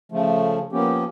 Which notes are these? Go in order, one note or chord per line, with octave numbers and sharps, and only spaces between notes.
C#3 F3 A3
F3 A#3 B3 C#4 G4